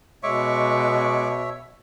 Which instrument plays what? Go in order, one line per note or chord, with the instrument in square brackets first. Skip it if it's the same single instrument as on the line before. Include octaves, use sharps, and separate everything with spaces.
[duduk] B2 [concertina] G#3 C#6 D6 [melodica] C#5 E5